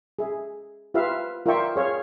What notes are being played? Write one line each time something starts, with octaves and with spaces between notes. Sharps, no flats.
G#4 E5
F4 G4 B4 E5 F5
F4 A#4 D5 E5 G5 C#6
G#4 C#5 F5